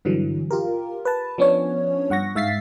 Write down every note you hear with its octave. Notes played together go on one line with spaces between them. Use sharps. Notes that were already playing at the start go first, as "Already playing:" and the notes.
G2 D3 E3 F#3
F4 G4 A#4
B4 A5
F3 B3 C#4 D4 C#5
G2 F#5 C#6 A#6
G#2 E5 F5 A6 B6 C7